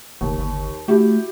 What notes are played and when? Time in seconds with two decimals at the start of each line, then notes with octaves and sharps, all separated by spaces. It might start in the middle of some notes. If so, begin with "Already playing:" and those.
0.21 F#1 D#2
0.38 G1
0.88 A3 E4 F#4 G4